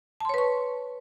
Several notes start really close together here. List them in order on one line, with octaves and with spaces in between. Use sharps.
A5 C6 C#5 B4 C#6